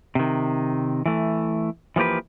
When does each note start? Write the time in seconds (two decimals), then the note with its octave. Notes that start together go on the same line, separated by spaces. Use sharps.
0.15 C3 D#3
1.06 E3 A3
1.96 E3 F3 A#3 G4 B4